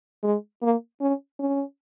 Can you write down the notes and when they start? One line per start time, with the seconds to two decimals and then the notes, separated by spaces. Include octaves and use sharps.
0.23 G#3
0.62 A#3
1.01 C#4
1.40 C#4